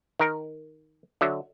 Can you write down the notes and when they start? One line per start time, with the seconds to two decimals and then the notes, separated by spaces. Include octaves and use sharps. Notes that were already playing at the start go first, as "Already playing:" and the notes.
0.19 D#3 A#4
1.21 D3 F#3 E5